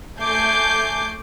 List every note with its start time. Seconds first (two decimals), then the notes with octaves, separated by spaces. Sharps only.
0.20 A3 G#5 D6 G6 C7